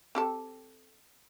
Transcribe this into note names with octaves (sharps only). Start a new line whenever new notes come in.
C4 G4 A4